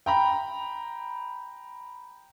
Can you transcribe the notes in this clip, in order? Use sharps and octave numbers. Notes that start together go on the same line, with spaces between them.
G5 A#5 B5